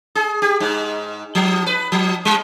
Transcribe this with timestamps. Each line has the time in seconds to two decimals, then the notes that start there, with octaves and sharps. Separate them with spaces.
0.15 G#4
0.42 G4
0.60 G#2
1.35 F3
1.66 B4
1.92 F3
2.25 G3